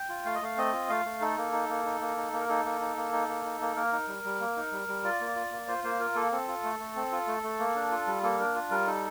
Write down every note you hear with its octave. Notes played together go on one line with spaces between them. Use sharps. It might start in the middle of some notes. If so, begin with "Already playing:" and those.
Already playing: G5
F4
A3 F5
D#5
A3 F5
C4 D#5
F4
A3 F5
A3
D#4 A4
A#3
D#4
A#3
D#4
A#3
D#4
A#3
A#4
D#4 A4
A#3
D#4
A#3
D#4
A#3
D#4
A#3
A#3 A#4
D#4
G3
G3
A#3
D#4
G3
G3
F4 D5
A#3
F4
A#3
F4 C5
A#3 C5
F4 A#4
A#3 A4
C4 A4
F4
A3
A3
C4
F4
A3
A3
A#3
D4
F4
G3
A#3 A4
D4 A#4
F4
G3 A#4
D#4 A4